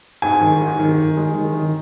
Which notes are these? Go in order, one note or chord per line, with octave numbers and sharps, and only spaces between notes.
G#2 G#5
D#3
G#2
D#3
D#3
G#3
D#3
D#3